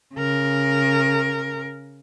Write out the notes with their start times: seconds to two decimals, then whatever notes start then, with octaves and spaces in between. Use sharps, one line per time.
0.15 C#3 A#4